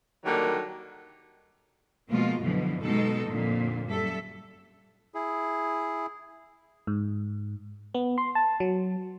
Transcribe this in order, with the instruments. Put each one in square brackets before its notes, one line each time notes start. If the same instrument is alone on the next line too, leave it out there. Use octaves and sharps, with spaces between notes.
[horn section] D3 D#3 F#3 G3 A#3
[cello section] B2 F3 G#3 A#3 F4
F#2 B2 D3 E3 F3
B2 G#3 D#4 A4
F2 A#2 D3
F#2 G3 A4 E5
[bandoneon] E4 G#4
[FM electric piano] G#2
B3
C6
A5
F#3